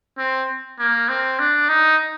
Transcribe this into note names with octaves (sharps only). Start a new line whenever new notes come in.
C4
A#3
C4
D4
D#4